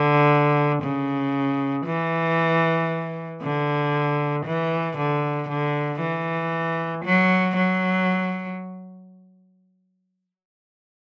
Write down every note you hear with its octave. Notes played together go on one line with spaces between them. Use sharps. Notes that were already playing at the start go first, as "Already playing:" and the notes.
Already playing: D3
C#3
E3
D3
E3
D3
D3
E3
F#3
F#3